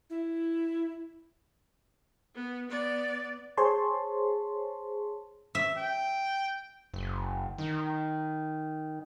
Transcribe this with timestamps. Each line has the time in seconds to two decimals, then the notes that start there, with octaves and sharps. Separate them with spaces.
0.10 E4
2.35 B3
2.69 B3 D5
3.57 G#4 C5 C#5 A5 C6
5.55 E5
5.77 G5
6.94 F#1
7.58 D#3